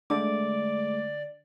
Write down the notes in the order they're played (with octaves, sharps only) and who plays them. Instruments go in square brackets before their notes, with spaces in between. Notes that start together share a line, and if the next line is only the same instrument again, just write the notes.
[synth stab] D3 [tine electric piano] G#3 A3 [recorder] D5 [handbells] D6